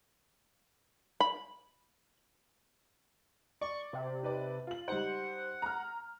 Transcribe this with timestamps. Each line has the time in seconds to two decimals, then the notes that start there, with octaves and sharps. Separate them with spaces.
1.20 B5
3.61 D5 C#6
3.93 C3
4.23 D#4 B4 D5
4.67 F4 F#7
4.88 G3 D#4 C5 F#5
5.62 A#5 F6